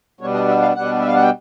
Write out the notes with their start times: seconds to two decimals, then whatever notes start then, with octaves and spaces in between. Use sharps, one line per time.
0.21 B2 G3 B3 D4 C#5
0.34 D#5
0.48 E5
0.62 F5
0.75 B2 G3 B3 D4 F#5
1.00 E5
1.07 F5
1.15 F#5
1.22 G5